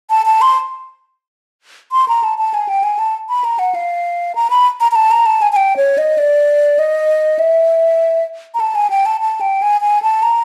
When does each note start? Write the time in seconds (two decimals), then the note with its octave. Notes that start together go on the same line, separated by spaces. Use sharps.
0.10 A5
0.26 A5
0.41 C6
1.92 C6
2.08 A#5
2.23 A5
2.38 A5
2.54 G#5
2.69 G5
2.83 G#5
2.99 A5
3.29 B5
3.44 A#5
3.59 F#5
3.75 F5
4.35 A#5
4.50 B5
4.80 A#5
4.91 A#5
4.96 A5
5.11 A#5
5.26 A5
5.42 G#5
5.52 G#5
5.56 G5
5.77 C#5
5.98 D#5
6.18 D5
6.79 D#5
7.39 E5
8.54 A#5
8.60 A5
8.75 G#5
8.90 G5
9.06 A5
9.21 A5
9.41 G5
9.62 G#5
9.81 G#5
10.02 A5
10.23 A#5